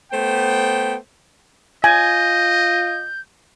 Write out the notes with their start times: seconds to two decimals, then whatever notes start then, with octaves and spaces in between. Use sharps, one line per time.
0.12 A3 B3 C5 G5
1.84 F4 D#5 G#5 G6